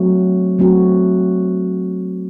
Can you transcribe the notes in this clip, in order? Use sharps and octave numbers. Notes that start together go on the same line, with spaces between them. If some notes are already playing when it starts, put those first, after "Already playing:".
Already playing: F#3 A3 C4 F#4
F#3 A3 C4 F#4